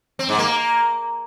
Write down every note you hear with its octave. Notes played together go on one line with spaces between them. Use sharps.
C4
G#2
A#3